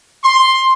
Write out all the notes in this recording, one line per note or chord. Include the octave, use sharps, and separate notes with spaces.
C6